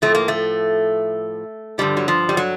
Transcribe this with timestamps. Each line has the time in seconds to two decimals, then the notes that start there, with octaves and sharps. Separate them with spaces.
0.02 A2 F3 A3
0.15 A#3
0.28 A3
1.78 G2 D3 F3 G3
1.97 F#3
2.08 F3
2.29 G3
2.37 F#3